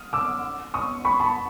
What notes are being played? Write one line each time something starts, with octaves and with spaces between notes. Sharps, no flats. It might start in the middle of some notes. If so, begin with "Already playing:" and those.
Already playing: D#6 F6
D6 E6
C#6 D#6
B5 C#6
A5 B5